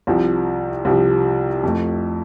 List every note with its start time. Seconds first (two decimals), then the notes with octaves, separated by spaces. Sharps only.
0.07 C2 C3 F3
0.85 C2 C3 F3
1.63 F2 F3 A3